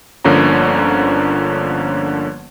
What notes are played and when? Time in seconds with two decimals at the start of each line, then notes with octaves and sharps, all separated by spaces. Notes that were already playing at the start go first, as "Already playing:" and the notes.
0.24 G1 D3 F3 A#3 C#4 A#5